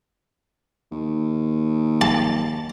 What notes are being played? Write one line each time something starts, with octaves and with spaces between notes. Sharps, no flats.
D#2
A5